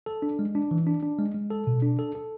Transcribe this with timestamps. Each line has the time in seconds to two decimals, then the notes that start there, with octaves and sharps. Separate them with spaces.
0.06 A4
0.22 D4
0.39 G#3
0.55 D4
0.71 E3
0.87 D4
1.03 D4
1.19 G#3
1.34 G#3
1.51 A4
1.67 B2
1.82 D4
1.99 A4
2.15 A4